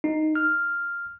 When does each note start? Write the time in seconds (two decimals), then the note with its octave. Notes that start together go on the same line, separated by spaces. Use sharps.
0.04 D#4
0.35 F6